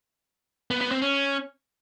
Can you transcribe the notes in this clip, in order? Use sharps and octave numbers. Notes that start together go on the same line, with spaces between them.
B3
B3
C4
C#4